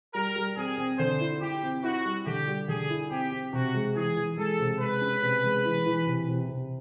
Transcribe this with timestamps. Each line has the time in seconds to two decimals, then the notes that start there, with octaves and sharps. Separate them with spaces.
0.15 G3 A#4
0.36 G3
0.57 C4 G#4
0.78 C4
0.99 D3 C5
1.20 E4
1.41 E4 G4
1.63 C4
1.83 E4 F#4
2.05 G3
2.26 D3 G4
2.47 G3
2.68 D3 G#4
2.90 E4
3.10 C4 G4
3.32 C4
3.53 C3 F#4
3.74 G#3
3.96 E3 G#4
4.16 E3
4.38 G#3 A4
4.60 C3
4.80 G#3 B4
5.02 C#4
5.23 C3
5.44 G#3
5.65 E3
5.86 E3
6.07 C3
6.28 C3
6.49 C3